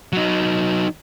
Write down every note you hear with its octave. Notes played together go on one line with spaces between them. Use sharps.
F#3 D#4